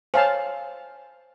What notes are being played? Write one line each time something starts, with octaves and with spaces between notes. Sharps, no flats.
C5 C#5 F5 G#5 A5